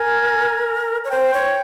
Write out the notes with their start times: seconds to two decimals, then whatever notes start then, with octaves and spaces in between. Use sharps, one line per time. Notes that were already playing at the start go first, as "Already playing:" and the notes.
Already playing: A#4 G#5
1.05 C#5
1.11 C5 G5
1.34 C#5